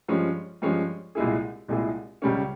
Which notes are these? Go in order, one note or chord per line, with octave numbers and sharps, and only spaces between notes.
G2 F3 G#3 C#4
G2 F3 G#3 C#4
C2 A#2 G#3 E4 G#4
C2 A#2 G#3 E4 G#4
C#2 C#3 G3 C#4